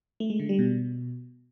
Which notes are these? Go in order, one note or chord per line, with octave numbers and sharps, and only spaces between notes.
A3
G#3
D3
G3
B2